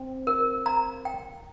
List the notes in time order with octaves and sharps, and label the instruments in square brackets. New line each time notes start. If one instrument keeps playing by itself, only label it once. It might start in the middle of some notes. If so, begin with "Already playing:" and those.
Already playing: [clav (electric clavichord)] C4
[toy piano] A#4
A#5
G5